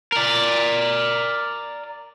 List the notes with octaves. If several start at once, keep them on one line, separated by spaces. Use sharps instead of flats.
A#4 D5